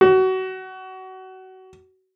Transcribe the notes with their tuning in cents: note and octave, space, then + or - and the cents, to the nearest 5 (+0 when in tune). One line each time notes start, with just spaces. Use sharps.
F#4 +25